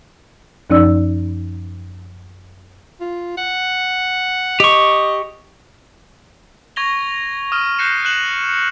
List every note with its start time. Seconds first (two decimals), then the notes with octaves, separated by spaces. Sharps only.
0.70 F#2 F3 C#4 D#4 D5 E6
3.01 F4
3.38 F#5
4.60 G4 D#5 C#6
6.76 C#6 G#6 A#6 F7 G7
7.52 D#6 F6 D#7 G7
7.78 F#6 G6 A#6 C7 C#7 E7
8.04 F#6 C#7 E7 F#7
8.49 C#7